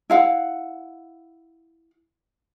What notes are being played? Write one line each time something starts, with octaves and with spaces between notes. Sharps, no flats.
E4 F5 F#5